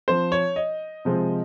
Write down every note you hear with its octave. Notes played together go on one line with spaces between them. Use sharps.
F3 C4 C5
C#5
D#5
C3 F3 G#3 C4